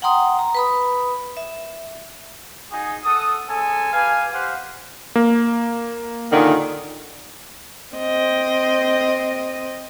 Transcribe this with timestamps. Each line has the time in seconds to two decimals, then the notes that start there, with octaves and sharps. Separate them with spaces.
0.02 F#5 G5 A#5 C6 D#6
0.39 A#5
0.54 B4 B5 D#6
1.37 E5
2.72 D#4 F#4 G#4
3.04 A4 F#5 D#6
3.48 G#3 C#4 A4 G#5
3.93 G4 B4 F5 G#5
4.33 G4 C5 F5 F#5
5.15 A#3
6.31 A#2 D3 D#3
7.96 C4 D#5